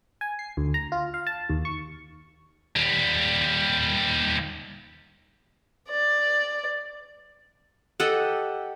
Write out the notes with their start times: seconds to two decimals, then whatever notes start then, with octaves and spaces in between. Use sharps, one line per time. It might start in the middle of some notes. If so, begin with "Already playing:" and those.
0.21 G#5
0.39 C7
0.57 D2
0.74 A#5
0.92 F4
1.14 F5
1.27 A5
1.50 D#2
1.65 C#6
2.76 D#2 G3
5.90 D5
8.00 G4 A4 D#5 F#5